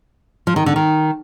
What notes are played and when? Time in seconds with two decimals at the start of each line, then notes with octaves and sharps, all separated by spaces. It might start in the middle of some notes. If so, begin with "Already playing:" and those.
0.47 F3
0.56 D#3
0.66 D3
0.76 D#3